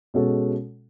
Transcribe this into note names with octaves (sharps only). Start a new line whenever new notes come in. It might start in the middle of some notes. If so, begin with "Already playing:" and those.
B2 G#3 C#4 F#4 A4